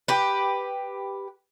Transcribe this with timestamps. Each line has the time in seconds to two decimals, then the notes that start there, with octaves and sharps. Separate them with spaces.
0.08 G4 B4